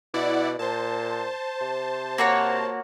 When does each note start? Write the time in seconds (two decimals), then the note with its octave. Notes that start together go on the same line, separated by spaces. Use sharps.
0.14 B2 E4 D5 F#5
0.59 A#2 C5 A5
1.62 C3
2.18 A#3 F#4 C#5